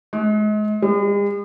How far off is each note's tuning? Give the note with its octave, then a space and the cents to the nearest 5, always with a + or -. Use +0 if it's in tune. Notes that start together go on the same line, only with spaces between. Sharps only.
G#3 +35
G#3 -45